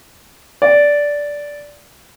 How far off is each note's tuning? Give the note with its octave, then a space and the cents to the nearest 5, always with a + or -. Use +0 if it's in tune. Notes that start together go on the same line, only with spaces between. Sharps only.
D5 -10